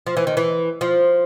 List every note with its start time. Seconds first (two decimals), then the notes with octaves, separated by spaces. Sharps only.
0.07 F3
0.17 E3
0.27 D#3
0.37 E3
0.81 F3